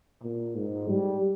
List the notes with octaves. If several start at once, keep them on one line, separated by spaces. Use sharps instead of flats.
A#2
G#2
G3